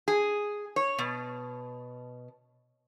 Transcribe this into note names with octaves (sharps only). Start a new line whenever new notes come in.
G#4
C#5
B2